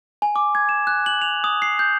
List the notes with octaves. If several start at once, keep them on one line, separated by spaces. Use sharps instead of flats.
G#5
D6
G#6
E7
F#6
F#7
F7
D#6
C7
G6